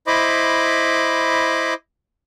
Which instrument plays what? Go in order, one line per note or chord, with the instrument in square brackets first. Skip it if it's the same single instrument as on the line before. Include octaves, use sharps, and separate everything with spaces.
[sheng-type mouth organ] E4 C5 D#5 B5 D6